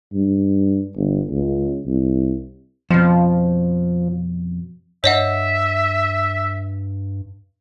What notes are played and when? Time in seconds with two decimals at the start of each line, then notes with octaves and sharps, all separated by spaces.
0.13 G2
0.96 G1
1.30 C#2
1.86 C2
2.90 F2 B2 F3
5.04 G2 C#5 D#5 E5 F#5